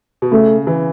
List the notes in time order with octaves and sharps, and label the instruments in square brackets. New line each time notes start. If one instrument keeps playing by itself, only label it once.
[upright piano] B2
[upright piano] C#3 [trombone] A3
[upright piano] E3